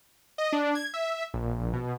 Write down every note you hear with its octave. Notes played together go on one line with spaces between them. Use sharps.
D#5
D4
G#6
E5
A#1
B2